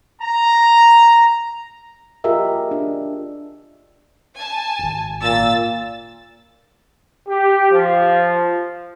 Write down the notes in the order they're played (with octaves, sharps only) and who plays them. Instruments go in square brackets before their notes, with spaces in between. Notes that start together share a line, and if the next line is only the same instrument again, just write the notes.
[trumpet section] A#5
[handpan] F4 G4 G#4 A#4 D#5 E5
D4
[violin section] G#5 A5
[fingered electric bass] D1 G#1
[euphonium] A#2 [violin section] E6 A6
[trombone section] G4
F3